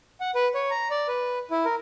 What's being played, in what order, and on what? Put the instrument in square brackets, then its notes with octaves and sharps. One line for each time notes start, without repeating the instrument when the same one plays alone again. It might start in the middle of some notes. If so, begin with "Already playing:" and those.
[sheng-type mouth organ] F#5
B4
C#5
A#5
D5
B4
E4
A#4